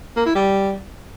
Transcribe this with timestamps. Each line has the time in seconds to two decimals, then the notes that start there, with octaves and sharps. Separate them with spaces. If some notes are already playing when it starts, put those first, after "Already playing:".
0.16 A#3
0.26 E4
0.35 G3